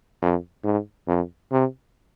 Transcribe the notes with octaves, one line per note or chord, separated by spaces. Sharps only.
F2
G#2
F2
C3